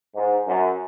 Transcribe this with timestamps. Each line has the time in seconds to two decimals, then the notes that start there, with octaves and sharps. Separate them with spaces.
0.16 G#2
0.47 F#2